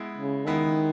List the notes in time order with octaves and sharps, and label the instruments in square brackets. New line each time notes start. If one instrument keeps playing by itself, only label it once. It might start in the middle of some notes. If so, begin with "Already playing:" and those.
Already playing: [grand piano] G#3 B3 E4
[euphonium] C#3
[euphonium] D#3 [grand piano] G#3 B3 E4